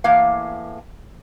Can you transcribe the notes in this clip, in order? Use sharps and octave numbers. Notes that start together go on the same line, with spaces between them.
E2 A2 A#3 F5